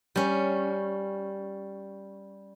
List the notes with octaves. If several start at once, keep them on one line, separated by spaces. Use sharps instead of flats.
G3 C#4